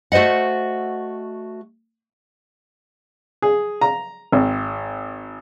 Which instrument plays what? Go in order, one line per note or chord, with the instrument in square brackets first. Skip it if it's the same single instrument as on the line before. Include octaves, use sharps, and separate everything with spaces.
[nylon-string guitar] A3 F#4 C5 D#5 F#5
[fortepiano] G#4
A#5
G#1